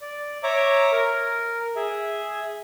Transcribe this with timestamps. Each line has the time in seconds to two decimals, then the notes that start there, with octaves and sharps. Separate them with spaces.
0.01 D5
0.43 C#5 E5 A#5 D6
0.92 A#4
1.76 G#4 E5